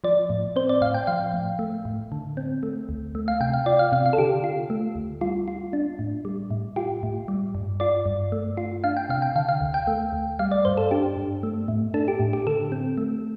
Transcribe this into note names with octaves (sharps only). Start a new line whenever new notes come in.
F3 D5
A2
C4 C5
D5
A2 F5
G5
F3 F5
A2
A3
A2
D3
C4
A3
D2
A3
F5
C3 G5
F5
F4 D5
F5
C3 F5
F5
A4
D3 G4
F4
A3
D2
G3 F4
F4
D4
A2
G3
A2
F4 G4
A2
G3
G2
F4 D5
G2
A3
F4
D4 F5
G5
C3 F5
G5
D3 F5
F5
D2
G5
A3
D2
G3 F5
D5
G2 C5
A4
D4 G4
G2
A3
A2
D4 A4
G4
A2
G4
D3 A4
C4
A3